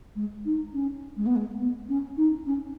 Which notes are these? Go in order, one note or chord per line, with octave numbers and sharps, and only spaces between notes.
G#3
D#4
C#4
G#3
B3
G#3
B3
C#4
D#4
C#4